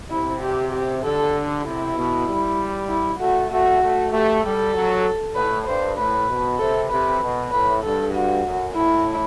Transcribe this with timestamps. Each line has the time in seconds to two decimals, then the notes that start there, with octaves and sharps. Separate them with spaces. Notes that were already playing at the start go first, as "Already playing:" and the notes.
0.10 C3 E4
0.42 G4
0.73 G4
1.03 D3 A4
1.65 C3 E4
1.95 B2
2.27 G3
2.89 E4
3.19 A3 F#4
3.50 A3 F#4
3.82 A3
4.12 A3 G4
4.43 G3 A4
4.74 F#3
5.35 A2 B4
5.67 G2 C5
5.97 A2 B4
6.29 B2
6.59 C3 A4
6.90 C3 B4
7.22 B2
7.51 A2 B4
7.83 G2 A4
8.14 F#4
8.45 F#2
8.75 A2 E4